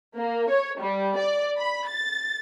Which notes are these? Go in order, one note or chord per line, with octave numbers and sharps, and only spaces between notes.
A#3
C#5
G3
D5
B5
A6